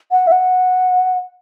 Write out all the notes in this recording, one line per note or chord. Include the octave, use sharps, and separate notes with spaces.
F#5
E5
F#5